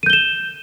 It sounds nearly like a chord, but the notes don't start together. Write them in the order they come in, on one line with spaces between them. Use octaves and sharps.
D#7 G6 G7 E7